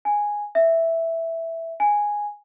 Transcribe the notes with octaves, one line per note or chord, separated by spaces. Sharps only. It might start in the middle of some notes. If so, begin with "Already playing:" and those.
G#5
E5
G#5